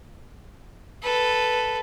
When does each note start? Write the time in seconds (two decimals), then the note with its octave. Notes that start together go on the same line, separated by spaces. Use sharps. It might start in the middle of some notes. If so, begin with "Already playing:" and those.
1.03 A4 B4